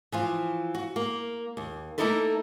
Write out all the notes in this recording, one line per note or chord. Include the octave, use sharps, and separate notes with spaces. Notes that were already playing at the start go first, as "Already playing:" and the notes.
E3 F3 F4
F#4
A#3
D#2
A3 A#3 D#4 E4 A4 B4